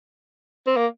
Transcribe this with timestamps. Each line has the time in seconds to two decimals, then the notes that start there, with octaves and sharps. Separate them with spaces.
0.67 C4
0.76 A#3